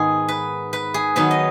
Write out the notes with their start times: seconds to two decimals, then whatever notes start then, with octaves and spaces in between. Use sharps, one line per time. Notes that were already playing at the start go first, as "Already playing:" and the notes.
Already playing: G#2 D#3 B3 G#4
0.29 B4
0.73 B4
0.94 G#4
1.16 D#3 F#3 B3 B4
1.31 D#5